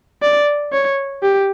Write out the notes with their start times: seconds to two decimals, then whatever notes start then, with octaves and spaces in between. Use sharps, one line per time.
0.22 D5
0.73 C#5
1.23 G4